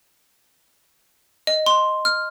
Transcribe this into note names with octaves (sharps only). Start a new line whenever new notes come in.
D#5
C6
F6